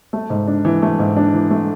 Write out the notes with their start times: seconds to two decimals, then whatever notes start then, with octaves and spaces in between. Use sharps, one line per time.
0.13 A3
0.30 G#2
0.47 D4
0.65 E3
0.82 A3
0.99 G#2
1.16 D4
1.33 E3
1.51 A3